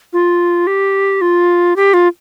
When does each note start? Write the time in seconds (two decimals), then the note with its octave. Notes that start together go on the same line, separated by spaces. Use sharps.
0.13 F4
0.67 G4
1.21 F4
1.76 G4
1.94 F4